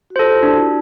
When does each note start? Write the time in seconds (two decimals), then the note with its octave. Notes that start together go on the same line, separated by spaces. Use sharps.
0.10 F#4
0.16 F4 G4 A4 C5
0.43 D4 E4 F#4